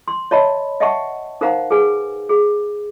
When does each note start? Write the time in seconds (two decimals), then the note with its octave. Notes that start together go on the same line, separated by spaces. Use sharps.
0.08 C6
0.31 C#5 D#5 E5 A5 B5
0.80 D#5 E5 F#5 G5 A5 C#6
1.41 D#4 A#4 C5 F5 F#5 A#5
1.71 G#4 B4 G#5
2.29 G#4